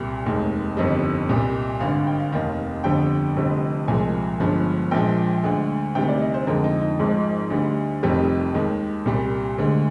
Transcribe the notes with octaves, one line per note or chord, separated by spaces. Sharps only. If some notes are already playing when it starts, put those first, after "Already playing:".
Already playing: C2 A#2 G3
F1 D#2 D#3 G#3
G1 F2 D#3 G3 D#5
C2 A#2 G3
G#1 G2 D3 F5
G5
F5
F1 D#2 D#3
G1 F2 D3 G3 G5
F1 F2 D3 G3
C2 A#2 F3 G#3 G#5
G1 G2 F3 G#3
A#1 A#2 F3 G#3 G5
D2 D3 G#3
D2 C3 D#3 G3 G5
D5
D#5
C5
F2 D3 F3 G#3 A#4
D#4
D#4
G#1 G#2 F3 G#3
D2 D3 G3
F1 F2 D#3 G3 G4
D#2 D#3 G#3
C2 A#2 G3
D2 D3 G#3